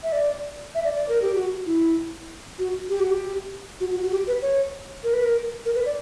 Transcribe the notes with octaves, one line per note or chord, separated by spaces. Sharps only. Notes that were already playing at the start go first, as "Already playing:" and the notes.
E5
D5
E5
D5
D5
A#4
G4
F#4
E4
F#4
G4
F#4
G4
F#4
F#4
F#4
G4
B4
C#5
A#4
B4
A#4
A#4
B4
D5